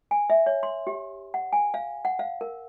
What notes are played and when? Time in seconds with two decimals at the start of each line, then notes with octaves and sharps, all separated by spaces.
0.11 G#5
0.30 E5
0.46 C#5
0.63 C6
0.87 G4
1.34 F#5
1.53 G#5
1.74 F5
2.05 F#5
2.19 F5
2.41 A#4